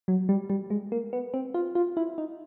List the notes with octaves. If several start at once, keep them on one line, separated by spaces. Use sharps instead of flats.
F#3
G3
G3
G#3
A#3
B3
C4
F4
F4
E4
D#4